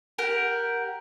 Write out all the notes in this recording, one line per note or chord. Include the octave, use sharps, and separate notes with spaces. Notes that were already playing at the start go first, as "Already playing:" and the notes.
G4 A#4 F#5